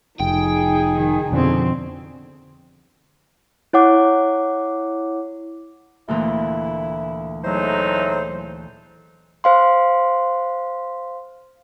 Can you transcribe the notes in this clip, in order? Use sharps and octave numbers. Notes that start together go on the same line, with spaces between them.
F1 D#4 G#4 G5
D#3
F2 B2 D3 F3 C4
E4 C#5 F#5 D6
D2 A#2 E3 E4
E2 F#3 A3 D#4 C5
C5 F5 C6